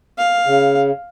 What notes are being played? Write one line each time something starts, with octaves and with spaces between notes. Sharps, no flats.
F5
C#3